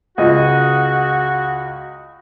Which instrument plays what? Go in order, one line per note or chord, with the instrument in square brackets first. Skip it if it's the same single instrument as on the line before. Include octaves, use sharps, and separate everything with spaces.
[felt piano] C#2 [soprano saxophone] F#4 [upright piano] D#5